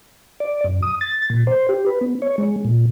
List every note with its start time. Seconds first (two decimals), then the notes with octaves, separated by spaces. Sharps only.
0.40 D5
0.64 F#2
0.82 D#6
1.01 A6
1.30 A#2
1.47 C5
1.69 G4
1.86 B4
2.01 B3
2.22 C#5
2.38 G#3
2.65 A#2